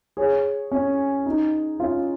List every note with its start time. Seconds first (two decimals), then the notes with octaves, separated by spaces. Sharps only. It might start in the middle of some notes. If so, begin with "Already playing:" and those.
0.17 G#4 C#5
0.72 C#4
1.26 D#4
1.80 C#4 F4